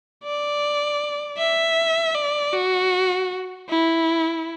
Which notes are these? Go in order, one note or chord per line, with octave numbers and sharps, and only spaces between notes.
D5
E5
D5
F#4
E4